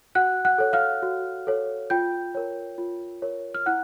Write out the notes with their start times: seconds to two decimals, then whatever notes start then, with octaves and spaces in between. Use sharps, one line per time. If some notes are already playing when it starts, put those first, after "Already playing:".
0.15 F#4 F#5 F#6
0.45 F#5 F#6
0.58 A4 C#5
0.73 F5 F6
1.03 F#4
1.47 A4 C#5
1.90 F4 G5 G6
2.35 A#4 C#5
2.78 F4
3.22 A#4 C#5
3.54 F6
3.66 E4 F#5 F#6